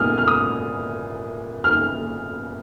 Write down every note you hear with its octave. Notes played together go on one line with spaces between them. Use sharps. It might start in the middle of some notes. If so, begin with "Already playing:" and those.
Already playing: A#2 G#3 B3 G#5 D#6 F6
F6
D#6
F6